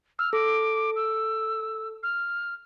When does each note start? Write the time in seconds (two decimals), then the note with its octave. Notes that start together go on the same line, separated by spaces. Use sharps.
0.19 E6 F6
0.33 A4 D6
0.96 E6
2.03 F6